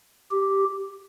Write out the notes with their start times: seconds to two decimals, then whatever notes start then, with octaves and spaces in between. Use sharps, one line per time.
0.31 G4